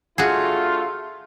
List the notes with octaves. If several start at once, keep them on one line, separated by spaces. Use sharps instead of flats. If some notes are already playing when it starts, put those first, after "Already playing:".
A3 D4 F4 F#4 G#4